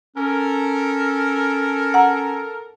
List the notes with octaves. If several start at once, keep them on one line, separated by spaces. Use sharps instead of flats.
C#4 A4 A#4
F#5 A#5